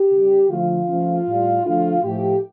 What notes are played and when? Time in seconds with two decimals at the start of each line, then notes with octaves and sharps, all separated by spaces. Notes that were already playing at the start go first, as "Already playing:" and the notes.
Already playing: G4
0.12 C#3 G3
0.50 D3 F3 A3 F4
0.89 C#3 F3 A3
1.27 A2 G3
1.65 D3 F3 A3 F4
2.03 A2 F3 A3 G4